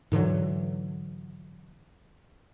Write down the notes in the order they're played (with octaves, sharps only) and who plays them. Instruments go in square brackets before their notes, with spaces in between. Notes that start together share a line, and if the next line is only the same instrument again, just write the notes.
[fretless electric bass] G#2 D3 E3 F#3